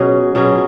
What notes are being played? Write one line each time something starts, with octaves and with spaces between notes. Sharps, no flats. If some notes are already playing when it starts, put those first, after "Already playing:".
Already playing: B2 F#3 C#4 G#4
B2 F#3 C#4 G#4